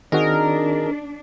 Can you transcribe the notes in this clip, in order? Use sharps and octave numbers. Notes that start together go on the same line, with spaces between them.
D#3 C4 D4 D#4 F#4 G#4 A#4 D#5